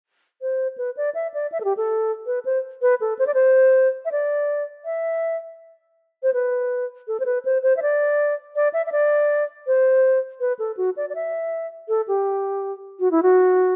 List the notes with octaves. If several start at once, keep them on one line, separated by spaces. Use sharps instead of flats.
C5
B4
D5
E5
D5
E5
A4
G4
A4
B4
C5
B4
A4
C5
D5
C5
E5
D5
E5
C5
B4
A4
C5
B4
C5
C5
E5
D5
D5
E5
E5
D5
C5
B4
A4
F#4
D5
D5
E5
A4
G4
F#4
E4
F#4